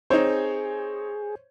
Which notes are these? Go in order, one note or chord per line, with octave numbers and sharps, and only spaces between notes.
C4 D#4 G#4 C5 C#5